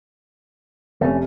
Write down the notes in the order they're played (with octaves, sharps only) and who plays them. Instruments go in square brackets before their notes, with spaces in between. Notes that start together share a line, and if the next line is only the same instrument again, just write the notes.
[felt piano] F1 C3 [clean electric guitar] A3 C#4